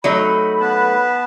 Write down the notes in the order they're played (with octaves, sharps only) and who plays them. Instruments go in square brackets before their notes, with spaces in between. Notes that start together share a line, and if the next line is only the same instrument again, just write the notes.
[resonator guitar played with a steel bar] F#3 A3 D#4 [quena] B5
[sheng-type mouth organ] B3 B4 A5